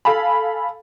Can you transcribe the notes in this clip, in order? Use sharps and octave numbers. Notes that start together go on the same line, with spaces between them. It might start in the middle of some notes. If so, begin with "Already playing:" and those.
A4 F5 G#5 B5